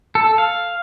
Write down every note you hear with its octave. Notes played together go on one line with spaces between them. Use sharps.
A4
F5